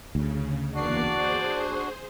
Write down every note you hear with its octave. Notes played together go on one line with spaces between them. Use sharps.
D2 C#3
E2 A#3 D4 F#4 D5 C7
G#4 C5